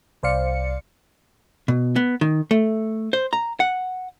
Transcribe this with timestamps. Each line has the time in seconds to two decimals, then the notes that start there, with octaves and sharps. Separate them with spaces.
0.23 C2 C5 D5 F5 C#7
1.68 B2
1.96 B3
2.21 D#3
2.51 A3
3.13 C5
3.33 A#5
3.60 F#5